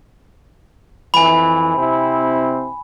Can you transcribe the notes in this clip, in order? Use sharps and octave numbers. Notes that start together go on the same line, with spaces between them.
F2 E3 G#5 B5
C3 C4 E4